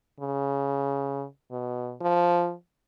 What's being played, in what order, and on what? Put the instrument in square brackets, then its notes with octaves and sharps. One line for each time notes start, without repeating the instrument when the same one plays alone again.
[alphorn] C#3
B2
F3